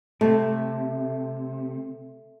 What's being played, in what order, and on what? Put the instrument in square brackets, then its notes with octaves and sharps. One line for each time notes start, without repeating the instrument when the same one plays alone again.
[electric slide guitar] C3 [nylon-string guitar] A3